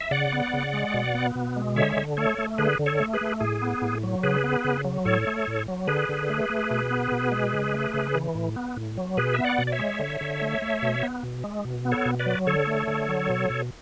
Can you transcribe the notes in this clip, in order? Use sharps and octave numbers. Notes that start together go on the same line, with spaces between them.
E5
C#3 D5 F#5
B3
C#3
G#3
B2
B3
B2
G#3
D3 C#5 E5
D3
A3 A4 C#5
A3
D3 G#4 B4
D3
A4 C#5
A3
G#4 B4
A3
A2 G#4
B3
A2
F#3
C#3 G#4 B4
B3
C#3
F#3
A2 A4 C#5
A3
A2
F#3
D3 G#4 B4
D3
A3
A3
B2
B3
B2
G#3
C#3
A3
C#3
E3
A2
B3
A2
F#3
B2 G#4 B4
B3 E5
D5 F#5
B2
D5
C#5 E5
G#3
D3
D3
A3
A3
B2
B3
B2
G#3
B2
B3
A4 C#5
B2
B4 D5
F#3
D3 A4 C#5
A3
D3
F#3
B2
B2